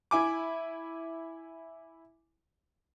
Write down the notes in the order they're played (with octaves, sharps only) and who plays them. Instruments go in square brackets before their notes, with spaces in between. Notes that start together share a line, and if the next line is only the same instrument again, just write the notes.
[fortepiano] E4 G#5 D6